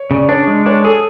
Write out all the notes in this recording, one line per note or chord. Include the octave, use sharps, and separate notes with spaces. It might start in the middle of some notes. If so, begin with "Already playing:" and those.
Already playing: C#5
C#3 D5
D4 C#5
G#3
D4 C#5
G#4 A4